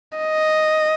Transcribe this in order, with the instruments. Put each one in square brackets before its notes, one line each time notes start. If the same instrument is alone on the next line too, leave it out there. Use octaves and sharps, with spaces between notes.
[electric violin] D#5